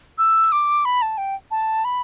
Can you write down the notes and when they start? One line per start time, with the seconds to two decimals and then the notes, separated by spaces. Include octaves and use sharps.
0.18 E6
0.52 D6
0.85 B5
1.02 A5
1.18 G5
1.51 A5
1.85 B5